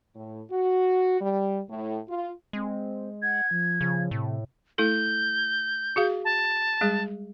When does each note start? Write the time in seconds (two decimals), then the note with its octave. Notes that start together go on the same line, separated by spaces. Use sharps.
0.15 A2
0.51 F#4
1.21 G3
1.69 A2
2.08 F4
2.53 G#3 C4
3.22 F#5 G#6
3.51 F3
3.81 C#3 F3
4.11 A2 C3
4.78 A3 E4 A4 G6
5.96 F#4 G#4 F5
6.25 A5
6.81 G3 G#3 G#4